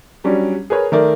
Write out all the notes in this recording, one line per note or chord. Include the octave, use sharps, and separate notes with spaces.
F#3 G3 C#4 D4
G#4 A#4 B4 C#5
D#3 A3 A#4 D5